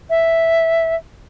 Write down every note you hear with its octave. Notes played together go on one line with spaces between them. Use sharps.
E5